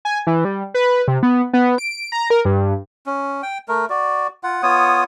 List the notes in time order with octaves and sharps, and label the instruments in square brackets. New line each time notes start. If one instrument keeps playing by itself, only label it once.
[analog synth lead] G#5
E3
G3
B4
C3
B3
B3
D7
A#5
A#4
G2
[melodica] C#4
G5
A3 A#4
F#4 D5
F4 F#5
B3 F4 C#5 D#6